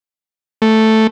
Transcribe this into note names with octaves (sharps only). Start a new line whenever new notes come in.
A3